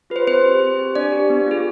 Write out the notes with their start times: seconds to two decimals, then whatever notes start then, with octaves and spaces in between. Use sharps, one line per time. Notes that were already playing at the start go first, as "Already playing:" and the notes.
0.10 F4 G#4 B4
0.16 C5
0.27 C4 C5
0.44 G4
0.61 C4
0.79 G4
0.95 D4 D5
1.12 G4
1.30 B3
1.47 F4 G#4